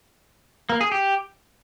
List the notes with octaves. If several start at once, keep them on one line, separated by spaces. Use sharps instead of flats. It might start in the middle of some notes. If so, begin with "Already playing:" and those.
A#3
G#4
G4